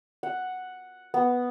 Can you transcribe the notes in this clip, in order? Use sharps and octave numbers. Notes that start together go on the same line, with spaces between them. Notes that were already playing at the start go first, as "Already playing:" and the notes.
F#5
B3